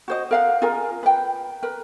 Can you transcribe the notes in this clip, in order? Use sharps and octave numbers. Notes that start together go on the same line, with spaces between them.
F#4 C5 D#5
A#4 F5 F#5
F4 G#4 A#4 G#5
B4 G5
A#4 B4